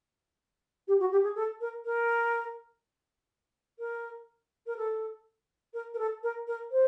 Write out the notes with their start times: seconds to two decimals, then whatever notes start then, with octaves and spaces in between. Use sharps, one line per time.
0.87 G4
0.99 F#4
1.11 G4
1.23 G#4
1.35 A4
1.60 A#4
1.85 A#4
3.79 A#4
4.66 A#4
4.77 A4
5.73 A#4
5.93 A#4
5.98 A4
6.23 A#4
6.47 A#4
6.71 C5